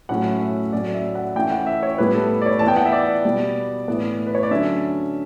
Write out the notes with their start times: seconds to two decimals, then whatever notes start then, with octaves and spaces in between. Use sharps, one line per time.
0.09 A2 F#3 A3 C#4 F#5
0.42 E5
0.73 A2 F#3 C#4 D5
0.94 E5
1.15 F#5
1.36 E3 A3 C#4 G5
1.51 F#5
1.67 E5
1.83 C#5
1.98 A2 G3 B3 B4
2.14 A4
2.41 D5
2.46 C#5
2.59 E3 A5
2.66 B3 G5
2.77 F#5
2.85 E5
2.93 D5
3.25 B2 G3 B3
3.88 A2 E3 B3
4.27 B4
4.35 C#5
4.43 D5
4.51 D3 F#3 C#4 E5